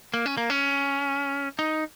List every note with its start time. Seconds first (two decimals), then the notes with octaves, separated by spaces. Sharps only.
0.14 A#3
0.26 C#4
0.38 A#3
0.50 C#4
1.59 D#4